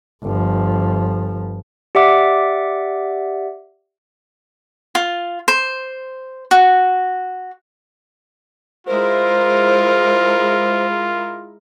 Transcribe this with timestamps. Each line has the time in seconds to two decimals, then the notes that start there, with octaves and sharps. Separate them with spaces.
0.23 G1 F3
1.95 G4 D5 E5 F#5 D6
4.95 F4
5.48 C5
6.51 F#4
8.87 G#3 E4 F4 A#4 C5